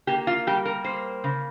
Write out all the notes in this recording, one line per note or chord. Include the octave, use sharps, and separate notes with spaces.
A#3 G4
F4
G3 G4
A#4
A#3 C5
C#3